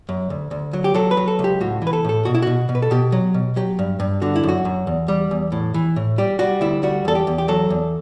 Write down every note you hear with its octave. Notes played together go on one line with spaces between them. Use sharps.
F#2
D2
D2
F#3
G4
F#3 A4
B4
F#3
A4
C#2
G4
A2 F#4
E3
B4
A4
A2 A4
B2 F#4
E4
B2 F#4
B2
B4
A4
B2 G4
F#3
B2
F#3 G4
G2
G2
D3 F#4
E4
F#2
F#4
F#2
E2
G3
E2
A2
E3
A2
G3 G4
G3 F#4
D2 E4
G3 F#4
E2 A4
G4
E2
G4
F#3 A4
E2